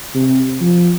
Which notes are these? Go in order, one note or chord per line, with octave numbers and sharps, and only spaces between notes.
C3
F3